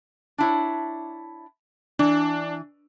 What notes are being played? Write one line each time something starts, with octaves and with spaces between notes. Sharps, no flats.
D4 E4 C#5
E3 D4